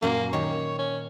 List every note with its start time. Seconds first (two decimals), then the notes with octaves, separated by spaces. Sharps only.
0.02 F#2 A#2 A#3 F#4
0.33 D#3 G4 C#5
0.79 C#4